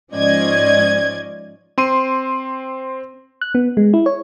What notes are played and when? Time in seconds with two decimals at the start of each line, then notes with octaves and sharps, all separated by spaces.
0.12 G#2 F3 C#4 D5 D#5 G#6
1.78 C4 C6 D#7
3.41 F#6
3.55 B3
3.77 G#3
3.94 E4
4.06 C#5